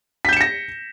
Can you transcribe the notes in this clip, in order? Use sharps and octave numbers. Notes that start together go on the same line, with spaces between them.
G6 A#6 B6 C#7 E7